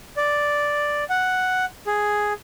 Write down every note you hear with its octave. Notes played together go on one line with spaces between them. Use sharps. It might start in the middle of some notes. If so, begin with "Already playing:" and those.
D5
F#5
G#4